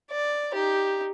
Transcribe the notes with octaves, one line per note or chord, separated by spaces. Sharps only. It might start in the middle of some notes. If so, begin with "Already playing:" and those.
D5
D#4 G4